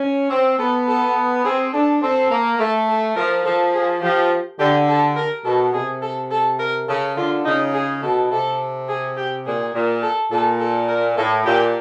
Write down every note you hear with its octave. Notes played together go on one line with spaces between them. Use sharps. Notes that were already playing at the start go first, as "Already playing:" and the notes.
Already playing: C#4
C4
B3 A4
A4
C4 G#4
D4 A4
C4 A4
A#3
A3 A4
A4
F3 A#4
F3 A4
G#4
F3 G4
D3 G4
A4
A#4
B2 A4
C3 G#4
A4
A4
A#4
C#3 A4
D3 F4
C#3 D#4
G#4
B2 A4
C3 A4
G#4
G4
A#2 G#4
A#2
A4
A#2 A4
A4
A#4
A2 A4
A#2 G4